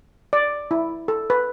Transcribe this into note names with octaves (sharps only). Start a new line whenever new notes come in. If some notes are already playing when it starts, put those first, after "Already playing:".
D5
E4
A4
B4